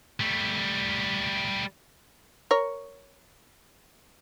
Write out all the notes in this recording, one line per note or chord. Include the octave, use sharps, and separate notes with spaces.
G3 A3
A#4 C#5